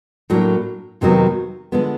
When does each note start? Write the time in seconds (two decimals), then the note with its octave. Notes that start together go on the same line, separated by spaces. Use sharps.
0.30 A2 F#3 A#3 D4
1.01 F2 C3 D#3 F#3 B3
1.72 D3 F3 G#3 B3